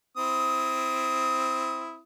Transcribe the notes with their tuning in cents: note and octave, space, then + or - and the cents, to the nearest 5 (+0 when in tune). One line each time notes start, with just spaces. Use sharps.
C4 +0 E4 +0 D#6 +20